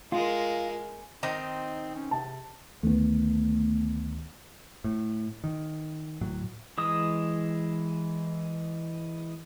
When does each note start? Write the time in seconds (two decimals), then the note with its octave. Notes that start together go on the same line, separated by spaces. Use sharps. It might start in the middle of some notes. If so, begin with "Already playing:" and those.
0.12 G#3 F4 A#4
1.23 D#3 C4 D#4 C5
1.95 C#4
2.11 C3 A5
2.83 D2 D#3 A3 B3
4.84 A2
5.44 D#3
6.21 D1 A2 F#3
6.78 E3 G#3 D#6